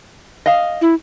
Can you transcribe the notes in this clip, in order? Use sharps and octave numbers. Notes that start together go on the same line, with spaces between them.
D#5 F5
E4